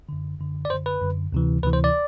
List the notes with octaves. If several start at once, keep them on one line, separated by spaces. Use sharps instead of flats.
F#2 D3
F#2 D3
D5
F#2 D3 C5
B4
F#2 D3
D2 C3 E3
D2 C3 E3 B4
C5
D5